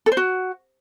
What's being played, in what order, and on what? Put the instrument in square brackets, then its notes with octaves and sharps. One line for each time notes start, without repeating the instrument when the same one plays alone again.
[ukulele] A4
C5
F#4